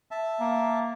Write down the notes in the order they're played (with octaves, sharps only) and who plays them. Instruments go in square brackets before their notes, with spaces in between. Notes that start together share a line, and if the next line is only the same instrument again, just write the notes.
[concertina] E5 A5
[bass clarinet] A#3